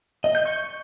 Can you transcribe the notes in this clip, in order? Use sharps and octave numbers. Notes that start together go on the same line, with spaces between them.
D#5
G6
C#6